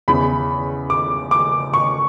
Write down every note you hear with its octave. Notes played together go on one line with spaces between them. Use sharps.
E2 C#3 E3 B5
D6
D6
C#6